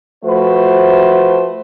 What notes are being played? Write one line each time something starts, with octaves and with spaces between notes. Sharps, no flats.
F3 A3 F#4 B4 C5